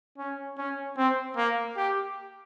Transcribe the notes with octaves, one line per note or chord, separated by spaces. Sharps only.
C#4
C#4
C4
A#3
G4